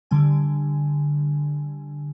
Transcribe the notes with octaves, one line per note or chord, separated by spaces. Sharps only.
D3 G3 G#5